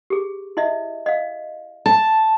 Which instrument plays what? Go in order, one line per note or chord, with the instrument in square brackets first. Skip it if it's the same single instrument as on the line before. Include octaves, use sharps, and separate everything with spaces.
[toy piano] G4 G#4
E4 D#5 E5
D#5 F5
[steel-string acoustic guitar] A5